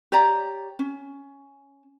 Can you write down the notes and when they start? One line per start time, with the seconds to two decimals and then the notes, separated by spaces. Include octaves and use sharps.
0.12 G4 C#5 D5 A#5
0.79 C#4